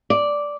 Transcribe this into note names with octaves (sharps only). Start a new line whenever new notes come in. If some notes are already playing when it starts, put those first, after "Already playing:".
D5